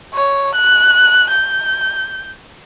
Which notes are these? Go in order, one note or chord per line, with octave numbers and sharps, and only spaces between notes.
C#5
F#6
G6